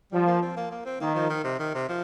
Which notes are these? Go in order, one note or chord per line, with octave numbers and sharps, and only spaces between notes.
F3 G3
A#3
C4
A#3
A#3
C4
D#3 A#3
F3
D#3
C3
D#3
C3
F3